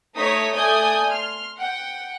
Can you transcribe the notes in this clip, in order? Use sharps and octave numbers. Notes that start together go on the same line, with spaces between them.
A3 D#4 C#5 D#6 B6
A3 D5 G#5 D#6 G6
C6 F6
F#5 G5